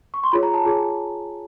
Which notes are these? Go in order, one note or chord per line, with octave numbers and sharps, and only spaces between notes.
C#6
C6
F4 G#4 C#5 B5
A#5
A5
F4 G#4 C#5 G#5